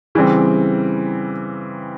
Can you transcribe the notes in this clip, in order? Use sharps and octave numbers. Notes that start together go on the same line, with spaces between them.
C#3 E3 G3 C4